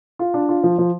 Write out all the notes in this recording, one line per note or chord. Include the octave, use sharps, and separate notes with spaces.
F4
D4
F4
F3
F3